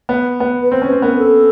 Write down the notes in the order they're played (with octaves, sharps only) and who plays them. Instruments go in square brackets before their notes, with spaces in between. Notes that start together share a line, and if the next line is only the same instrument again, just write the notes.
[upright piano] B3
B3
[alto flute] B4
[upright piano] C4 [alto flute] C5
[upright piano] C#4 [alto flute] B4
[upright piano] C4
[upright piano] B3 [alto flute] A#4
[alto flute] A4